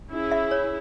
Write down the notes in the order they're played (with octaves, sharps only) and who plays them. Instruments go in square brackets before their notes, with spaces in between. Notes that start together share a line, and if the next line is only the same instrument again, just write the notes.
[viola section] C#4 E4 G#4
[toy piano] E5
C#5